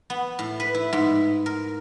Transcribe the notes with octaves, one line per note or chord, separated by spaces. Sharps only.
B3
A2
B4
E4
G#2
A#4